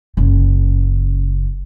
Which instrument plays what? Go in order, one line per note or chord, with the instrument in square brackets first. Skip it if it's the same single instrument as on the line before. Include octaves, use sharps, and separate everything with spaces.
[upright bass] F#1 C#3